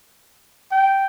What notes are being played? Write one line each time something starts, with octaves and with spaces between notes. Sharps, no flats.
G5